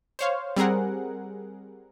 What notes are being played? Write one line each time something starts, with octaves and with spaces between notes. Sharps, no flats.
C5 C#5 F5
G3 C4 G#4 A#4 F#5